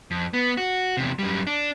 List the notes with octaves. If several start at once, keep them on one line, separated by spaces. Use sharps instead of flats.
F2
B3
F#4
E2 C3
F#2 G3
D4